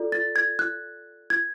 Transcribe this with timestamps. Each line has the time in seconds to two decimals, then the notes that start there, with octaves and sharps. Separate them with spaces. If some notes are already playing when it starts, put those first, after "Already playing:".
Already playing: F4 A4 D5
0.12 A6
0.36 G#6
0.59 F#6
1.30 G#6